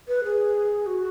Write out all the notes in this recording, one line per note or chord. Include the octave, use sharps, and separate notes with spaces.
B4
G#4
F#4